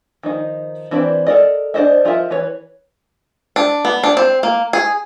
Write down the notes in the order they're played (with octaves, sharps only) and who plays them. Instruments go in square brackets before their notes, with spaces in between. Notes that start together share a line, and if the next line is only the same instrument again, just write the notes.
[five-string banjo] D#3 F3 D#4
E3 C4 D4 B4 D5
A4 A#4 D5 D#5
D4 G#4 C5 D#5 E5
F3 F4 A#4 D#5 E5
E3 B4 C#5
D4
B3
D4
C4
A#3
G#4